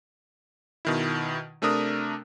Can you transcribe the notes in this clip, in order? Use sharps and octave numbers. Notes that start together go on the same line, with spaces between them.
B2 D#3 E4
C3 A3 D4 A#4 D#6